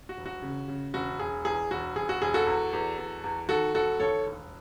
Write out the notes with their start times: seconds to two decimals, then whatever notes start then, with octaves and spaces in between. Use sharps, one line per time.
0.09 F#4
0.17 E1
0.26 F#4
0.42 C#3
0.68 C#3
0.94 E1 F#4
1.20 E1 G#4
1.45 E2 G#4
1.71 E1 F#4
1.96 E1 G#4
2.09 F#4
2.22 E1 G#4
2.34 F#4 A4
2.47 E2
2.73 E2
2.98 E2
3.24 E2
3.49 D#3 F#4 A4
3.75 E1 F#4 A4
4.00 D#2 A4 C#5
4.26 E1